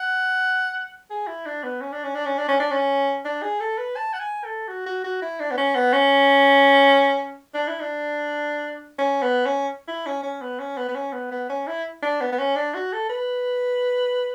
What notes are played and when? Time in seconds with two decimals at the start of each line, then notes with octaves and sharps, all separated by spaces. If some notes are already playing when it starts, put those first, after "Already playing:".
Already playing: F#5
1.10 G#4
1.27 E4
1.46 D4
1.63 B3
1.81 C#4
1.92 D4
2.04 C#4
2.15 D4
2.26 C#4
2.38 D4
2.48 C#4
2.60 D4
2.71 C#4
3.25 D4
3.43 G#4
3.60 A4
3.78 B4
3.96 A5
4.13 F#5
4.20 G#5
4.44 A4
4.68 F#4
4.86 F#4
5.04 F#4
5.22 E4
5.40 D4
5.51 B3
5.58 C#4
5.75 B3
5.93 C#4
7.54 D4
7.68 E4
7.80 D4
8.98 C#4
9.22 B3
9.46 C#4
9.88 E4
10.06 C#4
10.23 C#4
10.41 B3
10.59 C#4
10.77 B3
10.88 B3
10.95 C#4
11.13 B3
11.31 B3
11.49 C#4
11.67 E4
12.03 D4
12.21 B3
12.32 B3
12.39 C#4
12.56 D4
12.74 F#4
12.92 A4
13.10 B4